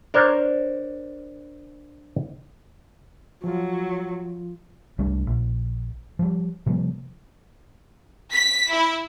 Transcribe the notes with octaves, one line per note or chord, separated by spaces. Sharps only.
D4 A#4 C5 C#5
F3 F#3 F4
C2 G3 A3 D4
A#1
F3 G3
C3 F3 G3 A#3
B6
E4